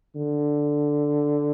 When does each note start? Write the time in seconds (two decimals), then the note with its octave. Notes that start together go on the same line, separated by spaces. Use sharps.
0.15 D3